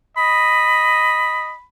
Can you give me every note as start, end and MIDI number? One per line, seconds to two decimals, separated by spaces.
0.17 1.53 75
0.17 1.64 83